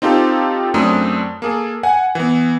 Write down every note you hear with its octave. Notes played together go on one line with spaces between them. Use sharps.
C4 D#4 F4 G4 A4
F#2 A3 C4 D4 D#6
A#3 G#4 A4
F#5 G#5
E3 B3